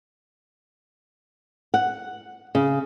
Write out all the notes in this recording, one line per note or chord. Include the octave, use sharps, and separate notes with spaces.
F#5
C#3